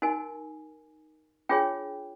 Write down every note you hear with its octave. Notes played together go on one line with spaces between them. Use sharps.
D#4 F#4 A#4 G#5
D4 F4 G#4 C#5 G5